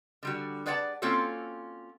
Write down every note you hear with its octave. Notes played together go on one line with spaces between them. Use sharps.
D3 G3 F#4
G#4 B4 D5 F#5 G#5 A5
A#3 C4 C#4 F4 F#4 A4